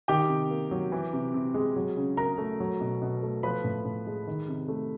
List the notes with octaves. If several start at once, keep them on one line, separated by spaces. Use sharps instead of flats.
D#3 G4 G5
C3
A#3
F#3
E3
C3
C3
G#3
F#3
C#3
C#3 A#4 A#5
A3
F#3
B2
B2
A3
F3 B4 B5
A2
A2
G#3
D#3
C3
A3